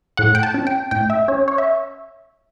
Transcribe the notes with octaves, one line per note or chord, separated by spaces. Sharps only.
A2 F#5
G5
A5
C#4
G5
A2 G5
E5
C#4 C#5
C#5
E5